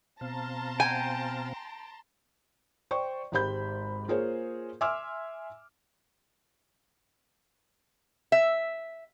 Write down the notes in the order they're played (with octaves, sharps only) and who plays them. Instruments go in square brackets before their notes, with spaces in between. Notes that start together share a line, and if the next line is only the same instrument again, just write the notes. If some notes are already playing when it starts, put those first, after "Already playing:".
[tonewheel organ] B2 C4 F5 [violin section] A5 A#5 C6
[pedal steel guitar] G5 [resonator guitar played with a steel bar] G#5
[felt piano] C5 D5 G5 C#6
G#1 G#2 G4 C5 B5 G6
A#3 F4 G#4 A#4 C5 C#5
E5 G#5 C6 D6 E6 F6
[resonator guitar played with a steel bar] E5